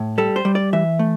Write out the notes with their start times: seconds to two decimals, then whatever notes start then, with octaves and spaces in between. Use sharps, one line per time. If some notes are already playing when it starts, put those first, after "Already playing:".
Already playing: A2
0.18 G3 A4
0.36 C5
0.45 G3
0.55 D5
0.73 E3 E5
0.99 A3